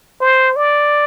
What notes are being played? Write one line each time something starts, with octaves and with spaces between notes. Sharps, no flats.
C5
D5